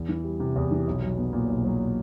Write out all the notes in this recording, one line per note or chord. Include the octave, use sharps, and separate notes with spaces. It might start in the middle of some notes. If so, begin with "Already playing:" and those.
Already playing: E2
E3
G3
C3
E2
E3
B1
F#3
B3
A#2
B1
F#3